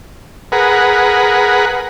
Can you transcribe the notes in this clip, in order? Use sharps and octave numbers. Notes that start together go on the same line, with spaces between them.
G#4 A#4 B4 F#5